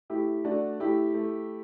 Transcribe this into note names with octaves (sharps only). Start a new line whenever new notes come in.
A3 E4 G4
A3 D4 F#4
A3 E4 G4
A3